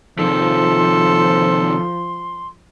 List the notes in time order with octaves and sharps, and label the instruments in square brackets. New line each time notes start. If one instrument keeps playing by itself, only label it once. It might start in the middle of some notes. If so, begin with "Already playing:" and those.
[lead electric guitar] C3 D#3 [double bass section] F3 [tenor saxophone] A4 [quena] C6